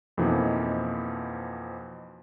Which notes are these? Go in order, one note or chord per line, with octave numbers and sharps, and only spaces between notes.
F2 B2 E3 F3 A#3 D#4